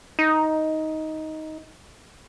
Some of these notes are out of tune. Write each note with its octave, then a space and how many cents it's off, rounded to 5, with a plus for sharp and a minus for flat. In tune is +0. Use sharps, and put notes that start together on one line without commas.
D#4 +10